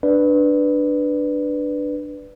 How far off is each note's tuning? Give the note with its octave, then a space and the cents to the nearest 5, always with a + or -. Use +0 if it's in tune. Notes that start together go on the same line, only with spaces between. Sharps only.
D4 +10 B4 +0 D5 +0